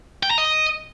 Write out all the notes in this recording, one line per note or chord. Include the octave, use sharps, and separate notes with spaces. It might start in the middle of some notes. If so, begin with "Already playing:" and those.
G5
A#5
D#5